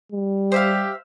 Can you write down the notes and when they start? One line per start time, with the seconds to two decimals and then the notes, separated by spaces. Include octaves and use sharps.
0.12 G3
0.52 G4 C5 E5 F5